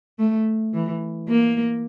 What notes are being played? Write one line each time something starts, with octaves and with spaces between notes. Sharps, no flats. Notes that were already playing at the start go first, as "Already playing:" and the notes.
A3
E3
A#3